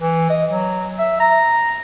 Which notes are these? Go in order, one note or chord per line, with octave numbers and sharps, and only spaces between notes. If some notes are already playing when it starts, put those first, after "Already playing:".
E3
D#5
F#3
E5
A#5